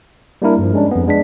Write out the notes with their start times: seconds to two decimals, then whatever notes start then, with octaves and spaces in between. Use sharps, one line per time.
0.42 G3 A#3 D4 E4 A#4
0.59 G2 F3
0.73 G#3 C#4 D4
0.91 F2 B3
1.08 G#3 D4 B6